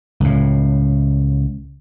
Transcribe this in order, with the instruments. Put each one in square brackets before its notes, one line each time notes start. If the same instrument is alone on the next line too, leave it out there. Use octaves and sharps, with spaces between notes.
[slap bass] C#2 A2